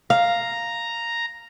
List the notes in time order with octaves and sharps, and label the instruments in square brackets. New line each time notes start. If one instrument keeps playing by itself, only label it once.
[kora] F5 [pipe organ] A#5